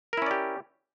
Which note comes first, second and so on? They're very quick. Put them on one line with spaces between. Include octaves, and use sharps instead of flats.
A#4 E4 C#4 D5 G4